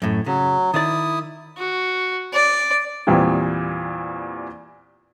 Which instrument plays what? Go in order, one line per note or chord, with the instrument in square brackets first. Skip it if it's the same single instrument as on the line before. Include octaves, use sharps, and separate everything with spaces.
[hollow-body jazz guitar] F#2 A2
[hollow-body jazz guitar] C#3 [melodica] F#3
[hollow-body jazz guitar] D#3 D5 [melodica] E4 D#6
[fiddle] F#4
D5
[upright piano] E2 A#2 E3 G3 C4